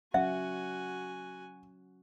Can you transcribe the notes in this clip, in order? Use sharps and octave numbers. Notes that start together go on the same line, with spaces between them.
F#3 C#4 F#4 E5 F#5 G#5